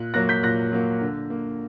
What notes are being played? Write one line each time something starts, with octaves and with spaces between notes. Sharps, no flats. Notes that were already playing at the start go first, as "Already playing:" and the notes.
Already playing: A#2 F#6
F#3 A#3 F#6 A#6
G6 B6
A#2 F#6 A#6
F#3 A#3
D3
A#3